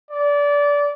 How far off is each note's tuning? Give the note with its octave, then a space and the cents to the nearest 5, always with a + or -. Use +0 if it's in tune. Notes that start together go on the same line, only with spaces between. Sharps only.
D5 -25